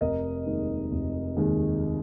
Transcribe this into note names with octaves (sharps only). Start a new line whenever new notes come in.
F1 A#4 D#5
D#2 D#3 G#3
F1
D#2 D#3 G#3